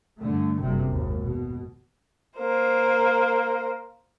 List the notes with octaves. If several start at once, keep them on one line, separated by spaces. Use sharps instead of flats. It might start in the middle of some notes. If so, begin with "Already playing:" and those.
G2 D3 A3
F#1 G2 C3
G#1 D#2
B2
A#3 C5